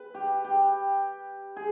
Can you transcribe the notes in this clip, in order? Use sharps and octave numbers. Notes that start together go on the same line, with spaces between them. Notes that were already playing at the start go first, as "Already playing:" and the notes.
Already playing: B4
G4
G4
G#4